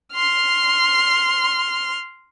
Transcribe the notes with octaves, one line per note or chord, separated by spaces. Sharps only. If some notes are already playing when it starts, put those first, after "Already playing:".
C6 F6